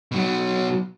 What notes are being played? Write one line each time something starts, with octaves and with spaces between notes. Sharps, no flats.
B2 F#3